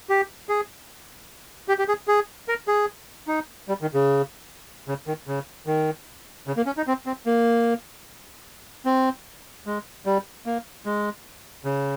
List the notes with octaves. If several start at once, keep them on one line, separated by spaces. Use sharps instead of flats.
G4
G#4
G4
G4
G#4
G#4
A#4
G#4
D#4
G3
D#3
C#3
C#3
D#3
C#3
D#3
C#3
A#3
C#4
D#4
C4
C4
A#3
C4
G#3
G3
A#3
G#3
C#3